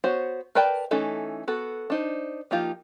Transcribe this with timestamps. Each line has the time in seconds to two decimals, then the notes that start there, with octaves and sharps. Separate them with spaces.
0.04 B3 F#4 C5 C#5
0.55 A#4 B4 D5 G5 A5
0.91 E3 A3 C#4 D#4 A4
1.48 B3 F#4 A4
1.90 D4 D#4 C5
2.51 F3 A#3 D#4 F4 G4